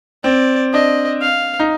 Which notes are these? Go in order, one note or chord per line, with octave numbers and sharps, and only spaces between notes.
C4 D5
D4 D#5
F5
D#4